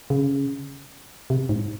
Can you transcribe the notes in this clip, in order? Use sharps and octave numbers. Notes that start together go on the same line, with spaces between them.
C#3
C3
G#2